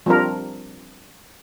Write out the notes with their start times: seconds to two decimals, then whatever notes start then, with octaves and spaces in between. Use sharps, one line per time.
0.06 F3 G3 C4 D4 A#4